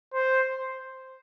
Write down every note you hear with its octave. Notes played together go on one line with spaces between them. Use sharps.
C5